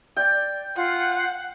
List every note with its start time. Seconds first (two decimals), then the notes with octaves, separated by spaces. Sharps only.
0.16 D5 G5
0.76 F4 F#5